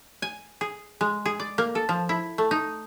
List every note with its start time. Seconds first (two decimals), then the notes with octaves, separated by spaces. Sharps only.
0.22 G#5
0.61 G#4
1.01 G#3
1.25 G#4
1.40 D5
1.58 A#3
1.75 A4
1.89 F3
2.09 E4
2.38 A3
2.51 D#4